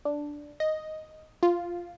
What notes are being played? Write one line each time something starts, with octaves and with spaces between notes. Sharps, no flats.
D4
D#5
F4